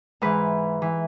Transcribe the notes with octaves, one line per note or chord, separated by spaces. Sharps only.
G#2 E3 B4
E3